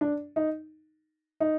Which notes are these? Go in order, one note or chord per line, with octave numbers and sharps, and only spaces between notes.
D4
D#4
D#4